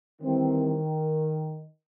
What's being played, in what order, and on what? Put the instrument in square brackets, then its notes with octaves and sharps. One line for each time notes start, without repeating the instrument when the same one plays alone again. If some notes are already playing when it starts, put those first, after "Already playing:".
[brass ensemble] D#3 [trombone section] E3 G3 C4